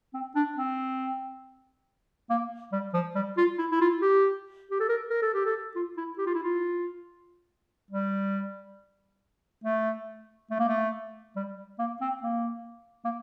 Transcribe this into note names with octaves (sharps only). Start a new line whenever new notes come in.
C4
D4
C4
A#3
G3
F3
G3
F4
E4
E4
F4
G4
G4
A4
A#4
A#4
A4
G4
A4
F4
E4
G4
F4
E4
F4
G3
A3
A3
A#3
A3
G3
A#3
C4
A#3
A#3